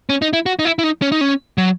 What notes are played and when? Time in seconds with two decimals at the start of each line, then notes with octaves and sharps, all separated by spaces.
0.09 C#4
0.22 D#4
0.33 E4
0.46 F#4
0.59 D#4
0.65 E4
0.79 E4
0.84 D#4
1.02 C#4
1.12 D#4
1.21 C#4
1.58 F#3